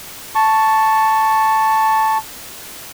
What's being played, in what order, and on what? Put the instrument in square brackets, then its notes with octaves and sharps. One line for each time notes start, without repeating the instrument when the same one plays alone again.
[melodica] A5 C#6